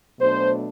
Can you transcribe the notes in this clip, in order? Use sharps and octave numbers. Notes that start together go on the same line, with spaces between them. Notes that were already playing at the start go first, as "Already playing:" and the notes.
B2 F#3 A3 D4 C5